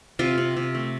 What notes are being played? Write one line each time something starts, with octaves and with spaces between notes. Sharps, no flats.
C3 F4
C3
C3
A3